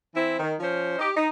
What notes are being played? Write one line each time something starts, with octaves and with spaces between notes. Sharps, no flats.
E3 C4 E4
D#3
F3 C#4 C5
D#4 G4
D#4